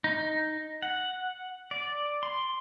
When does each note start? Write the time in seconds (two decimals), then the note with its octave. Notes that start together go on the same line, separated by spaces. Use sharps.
0.04 D#4
0.82 F#5
1.71 D5
2.23 C6